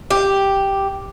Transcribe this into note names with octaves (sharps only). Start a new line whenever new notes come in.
G4